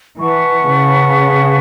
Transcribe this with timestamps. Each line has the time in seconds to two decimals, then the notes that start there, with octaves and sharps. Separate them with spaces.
0.19 E3 B4 F#5 A5 C#6
0.66 C#3